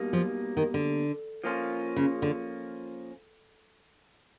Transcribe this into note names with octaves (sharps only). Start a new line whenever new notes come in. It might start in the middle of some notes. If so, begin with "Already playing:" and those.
Already playing: B2 G3 A#3 D#4
F3
D#3
D3
F3 A#3 C#4 F4
C#3
D3